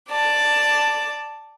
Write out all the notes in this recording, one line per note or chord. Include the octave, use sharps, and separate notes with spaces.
D5 A5